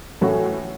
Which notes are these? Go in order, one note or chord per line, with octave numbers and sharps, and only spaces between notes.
A2 E3 A3 C#4 F#4